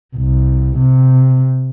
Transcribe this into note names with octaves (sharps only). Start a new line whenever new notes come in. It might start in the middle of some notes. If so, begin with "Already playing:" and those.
C2
C3